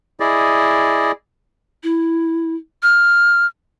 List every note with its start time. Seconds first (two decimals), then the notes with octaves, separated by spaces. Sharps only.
0.20 E4 G#4 D5 D#5
1.83 E4
2.83 F6